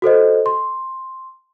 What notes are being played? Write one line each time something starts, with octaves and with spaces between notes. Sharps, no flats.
F#4 A4 C5 D#5
C6